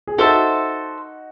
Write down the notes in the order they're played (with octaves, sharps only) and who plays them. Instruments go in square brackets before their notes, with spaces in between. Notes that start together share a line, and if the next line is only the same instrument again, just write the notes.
[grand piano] G#4
[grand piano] D#4 F#4 [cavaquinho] A4 C5 E5 A5